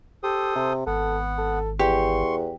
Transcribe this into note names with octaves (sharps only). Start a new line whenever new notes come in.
G4 A4 C5 D#6
C3
G#1 B3 A4 F#5
A4
E2 G4 C6 C#6